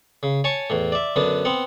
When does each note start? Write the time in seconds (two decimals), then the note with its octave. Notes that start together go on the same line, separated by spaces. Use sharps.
0.23 C#3
0.44 C#5 G#5 A5 C#6
0.70 E2 A2
0.92 D5 E5
1.16 F#2 D3 B3 D4
1.45 B3 C4 F#5